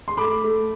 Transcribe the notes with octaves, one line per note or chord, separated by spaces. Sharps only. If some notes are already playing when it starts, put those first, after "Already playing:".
C6
A3 B5 D6
A3